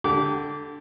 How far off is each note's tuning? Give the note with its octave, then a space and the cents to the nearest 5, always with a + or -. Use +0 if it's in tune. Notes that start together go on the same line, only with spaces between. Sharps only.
D3 +0 G4 +0 D6 -25